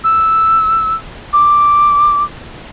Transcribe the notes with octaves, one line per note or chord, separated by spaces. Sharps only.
E6
D6